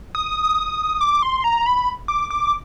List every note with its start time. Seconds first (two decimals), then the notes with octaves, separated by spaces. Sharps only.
0.15 D#6
1.01 D6
1.22 C6
1.44 A#5
1.66 B5
2.08 D6
2.30 D6